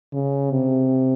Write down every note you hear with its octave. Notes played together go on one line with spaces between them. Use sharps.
C#3
C3